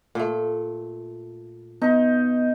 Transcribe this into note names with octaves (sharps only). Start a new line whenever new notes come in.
A#2 A3
B3 D#4